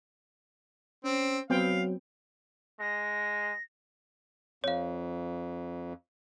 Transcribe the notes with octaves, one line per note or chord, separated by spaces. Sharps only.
C4 C#4
F#3 B3 C4 F5 G5
G#3 A#6
F2 C#5 F5